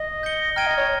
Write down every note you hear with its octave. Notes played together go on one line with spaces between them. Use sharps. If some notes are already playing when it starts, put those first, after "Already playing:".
Already playing: D#5
G6 A#6 C#7 G7
G5 A#5 F6 G#6 D#7 G7
D#5
C#5